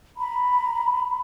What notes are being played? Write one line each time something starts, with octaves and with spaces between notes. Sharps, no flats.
A#5 B5